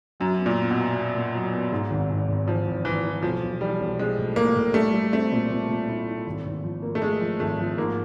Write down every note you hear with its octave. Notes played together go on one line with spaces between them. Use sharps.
F#2 F#3
B3
A#2
B3
B2
B3
B3
A#2
F#3
B3
G#2
G#1
G#1
G#1
E3 F3
G#1
G#1 E3
E3
B1 F3
B1
E3 G3
B1
B1 G#3
A2
A2 A#3
A2
G3 A3
G3
A3 C4
A#2
A#2
A#2
E4
E4
G#1
G#1
F3
A#3
A3
G#3 A#3
F3
G#1 A3
F3
G#2 A#3